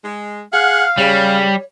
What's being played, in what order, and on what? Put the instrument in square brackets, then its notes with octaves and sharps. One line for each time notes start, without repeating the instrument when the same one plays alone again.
[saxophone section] G#3
[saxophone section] G#4 F#5 [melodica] F5 [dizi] F6
[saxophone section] C#3 [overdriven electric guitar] G3 [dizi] C#5